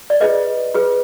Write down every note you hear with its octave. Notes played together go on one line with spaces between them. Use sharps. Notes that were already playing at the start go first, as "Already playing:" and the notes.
D5
F4 G#4 B4 D#5
F4 G#4 B4